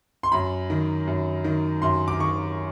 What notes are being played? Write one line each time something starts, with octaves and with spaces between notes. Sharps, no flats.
C6
F#2 B5
D#3
F#2
D#3
F#2 C6
D6
D#3 C#6